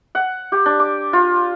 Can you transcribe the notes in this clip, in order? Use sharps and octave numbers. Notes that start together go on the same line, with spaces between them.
F#5
G4
D4
D6
F4